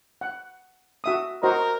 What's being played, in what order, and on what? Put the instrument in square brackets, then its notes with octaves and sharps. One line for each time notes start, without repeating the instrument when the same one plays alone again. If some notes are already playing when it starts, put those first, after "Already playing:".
[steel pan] F#5
F#4 E5 D#6
[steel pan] F#4 C5 D#5 [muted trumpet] A#4